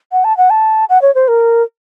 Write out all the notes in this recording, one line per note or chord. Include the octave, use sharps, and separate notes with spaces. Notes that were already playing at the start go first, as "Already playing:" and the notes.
F#5
A5
F#5
A5
F#5
C#5
C5
A#4